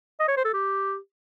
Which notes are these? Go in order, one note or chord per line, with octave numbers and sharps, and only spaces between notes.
D#5
C#5
C5
A4
G4